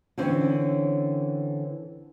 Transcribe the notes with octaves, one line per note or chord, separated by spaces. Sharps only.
D3 E3 C4 C#4